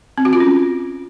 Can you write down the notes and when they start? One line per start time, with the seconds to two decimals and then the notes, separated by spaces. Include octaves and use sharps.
0.18 C4
0.25 F#4
0.33 F4
0.40 C#4